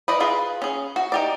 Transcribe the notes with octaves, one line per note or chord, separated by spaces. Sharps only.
B4 D5 D#5
F4 G#4 B4
C#4 G#4
F#4
D#4 G4 D5